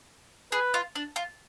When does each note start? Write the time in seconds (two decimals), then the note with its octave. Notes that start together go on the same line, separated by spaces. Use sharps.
0.52 G#4 B4
0.74 F4
0.96 D4
1.16 F4